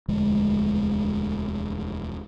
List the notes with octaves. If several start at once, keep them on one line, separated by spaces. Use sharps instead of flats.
E1 D2 F3 G#3